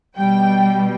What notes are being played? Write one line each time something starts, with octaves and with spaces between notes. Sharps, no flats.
B2 G3 G5